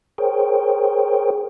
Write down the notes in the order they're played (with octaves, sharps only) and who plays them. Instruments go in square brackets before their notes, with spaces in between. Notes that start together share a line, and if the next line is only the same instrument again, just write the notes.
[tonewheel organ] G#4 A#4 C5 C#5 G5